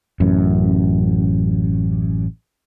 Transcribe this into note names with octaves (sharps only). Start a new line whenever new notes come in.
A1 F#2